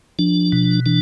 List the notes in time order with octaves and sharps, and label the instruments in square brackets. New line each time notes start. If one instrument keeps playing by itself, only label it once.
[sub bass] F3 [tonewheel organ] D4
[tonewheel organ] B2
[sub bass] E3 [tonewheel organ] D4